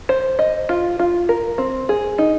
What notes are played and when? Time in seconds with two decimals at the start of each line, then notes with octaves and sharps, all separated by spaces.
0.09 C5
0.39 D#5
0.69 F4
0.99 F4
1.29 A#4
1.58 C4
1.89 G#4
2.18 D#4